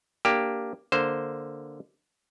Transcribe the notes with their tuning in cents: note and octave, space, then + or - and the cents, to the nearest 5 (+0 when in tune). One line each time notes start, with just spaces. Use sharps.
A#3 +0 D4 +0 G4 +0
D3 +0 A#3 +0 C5 +0